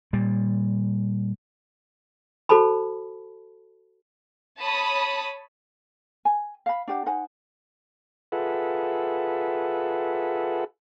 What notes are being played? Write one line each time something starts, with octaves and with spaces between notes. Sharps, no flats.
A#2 G3
F#4 A4 C5 A5 B5
C#5 A5 B5 D#6
G#5
F5 B5
D4 G4 F#5
D#4 C5 F#5 G#5
F4 G#4 A4 B4 E5 F#5